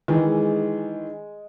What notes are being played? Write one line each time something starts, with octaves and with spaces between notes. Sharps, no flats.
D#3 E3 G#3